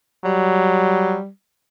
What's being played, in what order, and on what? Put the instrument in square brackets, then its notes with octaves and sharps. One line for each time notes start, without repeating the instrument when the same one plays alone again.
[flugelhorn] F#3 [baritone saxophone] G3